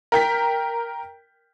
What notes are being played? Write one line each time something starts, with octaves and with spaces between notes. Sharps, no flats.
A#4 G5 B6